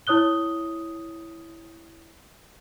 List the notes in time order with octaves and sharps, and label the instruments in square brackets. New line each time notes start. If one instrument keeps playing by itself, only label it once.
[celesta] E4 C#5 D#6 F#6 G7